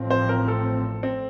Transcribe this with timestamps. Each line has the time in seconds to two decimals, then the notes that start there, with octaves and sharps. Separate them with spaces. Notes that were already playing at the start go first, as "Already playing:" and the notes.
Already playing: A1 A2 F3 C4
0.10 C5
0.29 A#4
0.48 A4
1.03 C4